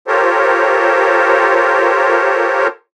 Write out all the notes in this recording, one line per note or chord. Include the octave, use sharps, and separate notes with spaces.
F4 G4 A4 A#4 C5 C#5